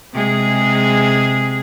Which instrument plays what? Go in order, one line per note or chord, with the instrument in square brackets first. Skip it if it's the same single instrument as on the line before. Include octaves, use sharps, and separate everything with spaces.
[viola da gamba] C3 G#3 G#4